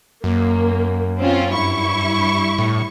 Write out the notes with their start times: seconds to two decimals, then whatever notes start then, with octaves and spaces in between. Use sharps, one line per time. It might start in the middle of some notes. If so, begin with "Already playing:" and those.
0.24 F#2 A#3
1.19 C4 C#4 F4
1.54 G2 E4 C#6
2.58 A2